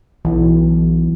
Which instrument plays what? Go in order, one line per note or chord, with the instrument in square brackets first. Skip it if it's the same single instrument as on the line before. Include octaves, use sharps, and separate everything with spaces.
[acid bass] B1 [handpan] E3